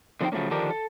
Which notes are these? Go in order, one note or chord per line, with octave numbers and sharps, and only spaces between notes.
D3 F3 C4 D#4 C5 G5
C#3 F3 F#3 A3 A#3 C#4
D3 D#3 F3 D4 G4 A#4
A4